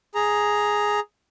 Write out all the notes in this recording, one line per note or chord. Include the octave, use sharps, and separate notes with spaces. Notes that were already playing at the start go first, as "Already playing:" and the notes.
G#4 A#5